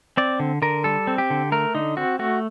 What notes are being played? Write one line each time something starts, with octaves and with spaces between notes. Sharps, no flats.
C4 D5
D3
D3 A#4
G3 A4
C4
G4
D3
A3 A#4
D3 D#4
C4 F#4
A3 F#4